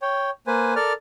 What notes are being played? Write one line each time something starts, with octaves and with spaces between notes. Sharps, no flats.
C#5 G5
A#3 B4 C5 G#5
A4 A#4 D5 F6